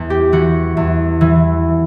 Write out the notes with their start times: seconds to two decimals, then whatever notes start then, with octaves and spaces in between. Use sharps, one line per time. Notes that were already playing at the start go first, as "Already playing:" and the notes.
Already playing: E2
0.10 G4
0.32 E3 F#4
0.77 E2
1.21 E3